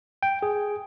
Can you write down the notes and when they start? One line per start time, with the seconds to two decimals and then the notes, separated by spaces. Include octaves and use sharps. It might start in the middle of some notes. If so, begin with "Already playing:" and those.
0.23 G5
0.43 G#4